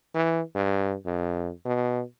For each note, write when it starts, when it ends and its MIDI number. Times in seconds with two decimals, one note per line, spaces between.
0.15 0.41 52
0.55 0.95 43
1.05 1.50 41
1.65 2.02 47